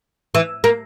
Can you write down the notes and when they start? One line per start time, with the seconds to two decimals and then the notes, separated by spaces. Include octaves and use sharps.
0.35 E3
0.64 A#3